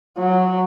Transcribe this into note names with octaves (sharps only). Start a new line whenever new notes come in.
F#3